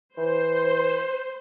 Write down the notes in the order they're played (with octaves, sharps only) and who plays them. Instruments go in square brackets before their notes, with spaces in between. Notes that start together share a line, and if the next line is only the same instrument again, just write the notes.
[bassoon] E3 [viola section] C5